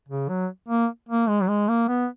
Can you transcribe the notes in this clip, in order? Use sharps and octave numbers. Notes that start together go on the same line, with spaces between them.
C#3
F#3
A#3
A#3
G#3
F#3
G#3
A#3
B3